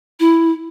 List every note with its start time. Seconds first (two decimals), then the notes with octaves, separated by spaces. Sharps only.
0.20 E4